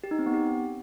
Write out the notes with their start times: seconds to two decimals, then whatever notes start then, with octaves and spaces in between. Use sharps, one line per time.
0.04 G4
0.11 D#4
0.19 C4
0.26 B3
0.34 G4